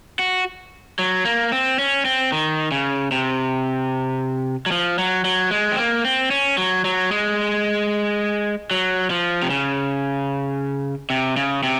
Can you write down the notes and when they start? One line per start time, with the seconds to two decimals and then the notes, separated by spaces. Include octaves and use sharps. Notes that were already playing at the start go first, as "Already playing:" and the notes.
0.19 F#4
0.99 F#3
1.25 A#3
1.52 C4
1.79 C#4
2.05 C4
2.32 D#3
2.72 C#3
3.12 C3
4.66 F#3
4.71 F3
4.98 F#3
5.24 F#3
5.51 G#3
5.72 C4
5.78 A#3
6.05 C4
6.31 C#4
6.58 F#3
6.85 F#3
7.11 G#3
8.71 F#3
9.10 F3
9.42 C3
9.50 C#3
11.10 C3
11.37 C#3
11.63 C3